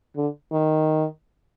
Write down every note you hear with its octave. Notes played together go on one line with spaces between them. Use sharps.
D3
D#3